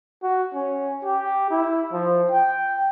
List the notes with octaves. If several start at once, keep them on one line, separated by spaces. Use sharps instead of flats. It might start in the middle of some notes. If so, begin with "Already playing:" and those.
F#4
C#4
G4
E4
F3
G5